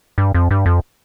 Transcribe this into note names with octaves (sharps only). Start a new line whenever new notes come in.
G2
F2
G2
F2